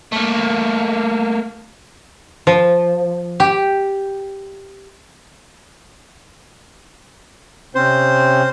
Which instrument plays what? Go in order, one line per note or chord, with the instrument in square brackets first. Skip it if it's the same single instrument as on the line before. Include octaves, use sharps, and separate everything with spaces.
[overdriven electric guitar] A3 A#3
[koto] F3
G4
[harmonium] C3 C4 C#4 [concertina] C5